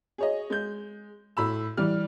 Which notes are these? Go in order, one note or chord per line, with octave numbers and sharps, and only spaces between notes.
G#4 C#5 D#5
G#3 G6
A2 B5 E6
E3 G3 F6